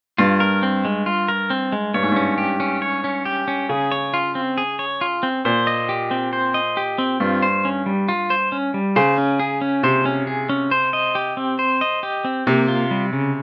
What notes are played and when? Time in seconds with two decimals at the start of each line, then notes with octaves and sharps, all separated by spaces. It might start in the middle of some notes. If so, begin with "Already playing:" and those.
0.18 G2 F4
0.40 A#4
0.63 C4
0.85 G#3
1.06 F4
1.28 A#4
1.50 C4
1.72 G#3
1.94 G2 C#5
2.03 G#2
2.12 G2 C#4
2.38 G4
2.60 C#4
2.82 C#5
3.04 C#4
3.25 G4
3.48 C#4
3.69 C#3 G#4
3.92 C#5
4.14 F4
4.35 C4
4.58 G#4
4.79 C#5
5.01 F4
5.23 C4
5.45 A#2 C5
5.67 D#5
5.89 G4
6.11 C4
6.33 C5
6.54 D#5
6.77 G4
6.98 C4
7.20 G2 F4
7.42 C5
7.65 C#4
7.86 G3
8.09 F4
8.30 C5
8.52 C#4
8.74 G3
8.96 C#3 C5
9.18 C#4
9.40 G#4
9.61 C#4
9.83 C3 C5
10.06 C#4
10.27 G#4
10.49 C#4
10.71 C5
10.93 D#5
11.15 G4
11.37 C4
11.59 C5
11.81 D#5
12.03 G4
12.25 C4
12.47 C3 A#3
12.68 F4
12.91 G3
13.13 C#3